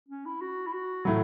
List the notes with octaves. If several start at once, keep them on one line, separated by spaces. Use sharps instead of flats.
C#4
E4
F#4
E4
F#4
A2 F#3 E4